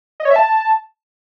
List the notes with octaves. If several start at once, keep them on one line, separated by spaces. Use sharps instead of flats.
D#5
C#5
E5
A5